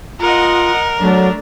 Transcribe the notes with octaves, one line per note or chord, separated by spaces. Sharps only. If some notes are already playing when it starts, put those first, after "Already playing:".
F4 A#4 D#5 F#5
F#3 A3 D4